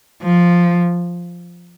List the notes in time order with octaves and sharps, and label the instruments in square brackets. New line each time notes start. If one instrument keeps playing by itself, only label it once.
[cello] F3